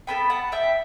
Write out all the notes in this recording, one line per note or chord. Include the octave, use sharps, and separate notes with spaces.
B3 F#4 A4 G5 B5
F#5 A5
E5 G5